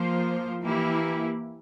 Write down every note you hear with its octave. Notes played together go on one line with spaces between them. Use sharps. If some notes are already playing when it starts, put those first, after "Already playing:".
Already playing: F3 A#3 F4 C5
E3 A#3 E4 G4